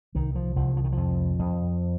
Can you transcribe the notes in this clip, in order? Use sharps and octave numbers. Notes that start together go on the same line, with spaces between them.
C2 D#3
F3
C2 F3
F3
D#3
F2 F3
F2